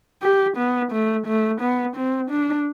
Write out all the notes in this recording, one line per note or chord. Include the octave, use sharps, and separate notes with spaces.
G4
B3
A3
A3
B3
C4
D4